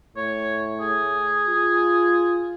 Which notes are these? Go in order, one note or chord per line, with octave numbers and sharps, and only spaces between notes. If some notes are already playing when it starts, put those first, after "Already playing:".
A2 C#5
G#4
F4